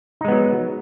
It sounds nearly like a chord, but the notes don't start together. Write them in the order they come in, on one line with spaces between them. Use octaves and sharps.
D#4 G#3 B3 F#3